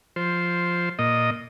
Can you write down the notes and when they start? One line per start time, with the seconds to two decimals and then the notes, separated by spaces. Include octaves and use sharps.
0.16 F3 C5
0.99 A#2 D#5